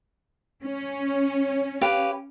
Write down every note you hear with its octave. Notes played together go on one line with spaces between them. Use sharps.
C#4
G4 B4 F5